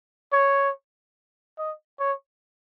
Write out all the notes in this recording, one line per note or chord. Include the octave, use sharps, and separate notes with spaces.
C#5
D#5
C#5